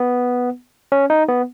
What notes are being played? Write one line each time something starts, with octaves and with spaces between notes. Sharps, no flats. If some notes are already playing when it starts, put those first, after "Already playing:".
Already playing: B3
C#4
D#4
B3